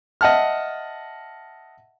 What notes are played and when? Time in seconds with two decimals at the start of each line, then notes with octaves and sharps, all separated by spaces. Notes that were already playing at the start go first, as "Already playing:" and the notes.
0.21 D#5 E5 F#5 A5 F6